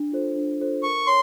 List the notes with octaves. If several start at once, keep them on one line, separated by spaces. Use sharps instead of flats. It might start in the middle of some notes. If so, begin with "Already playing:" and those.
Already playing: D4
F4 A4 C5
D4
F4 A4 C5
A#4 C#6
C#5 C6